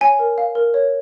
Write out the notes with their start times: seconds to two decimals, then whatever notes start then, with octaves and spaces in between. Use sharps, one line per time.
0.01 C#5 G#5
0.19 A#4
0.38 F5
0.55 A#4
0.74 C#5